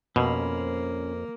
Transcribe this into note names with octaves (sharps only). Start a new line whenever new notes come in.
F2 B2 A#3 C#4 C5 B5